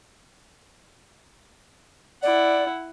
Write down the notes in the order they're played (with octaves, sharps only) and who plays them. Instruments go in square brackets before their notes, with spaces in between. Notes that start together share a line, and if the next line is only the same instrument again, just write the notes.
[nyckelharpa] E4 F#5 [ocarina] D5